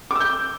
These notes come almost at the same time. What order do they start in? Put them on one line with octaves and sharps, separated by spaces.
D6 E6 G6